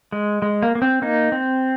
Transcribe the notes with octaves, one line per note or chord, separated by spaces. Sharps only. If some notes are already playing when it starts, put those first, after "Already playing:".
G#3
G#3
A#3
A#3
C4
A#3 D#4
C4